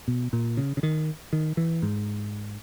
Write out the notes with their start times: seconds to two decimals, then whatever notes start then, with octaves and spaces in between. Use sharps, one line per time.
0.08 B2
0.33 A#2
0.57 C#3
0.77 C#3
0.83 D#3
1.33 D#3
1.57 E3
1.82 G#2